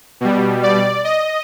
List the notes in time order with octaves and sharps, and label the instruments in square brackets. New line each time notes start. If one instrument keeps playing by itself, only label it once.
[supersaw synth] B2 G3
D5
D#5